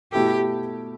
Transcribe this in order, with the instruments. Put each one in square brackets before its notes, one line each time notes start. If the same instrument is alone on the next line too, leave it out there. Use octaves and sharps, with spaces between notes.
[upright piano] B2 A3 E4 A4 [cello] G4